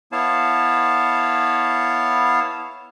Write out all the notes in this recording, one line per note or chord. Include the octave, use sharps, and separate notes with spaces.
B3 E4 C#5 F5 A5